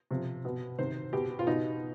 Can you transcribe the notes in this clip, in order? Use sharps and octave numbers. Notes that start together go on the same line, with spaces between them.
C3 F3
B2
C3 D#3 C5
B2 G4
F4
B2 D#4